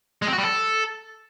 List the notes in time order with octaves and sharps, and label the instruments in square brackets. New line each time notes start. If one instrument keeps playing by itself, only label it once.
[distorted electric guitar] G#3
C4
F#4
G3
A4